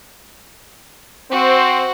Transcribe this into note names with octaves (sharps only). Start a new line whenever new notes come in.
C4 F#4 C5